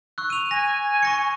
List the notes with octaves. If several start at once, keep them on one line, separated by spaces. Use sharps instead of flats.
C#6 E6 F#6
D#7 F7
G#5 A#6
C#6 A#6 C#7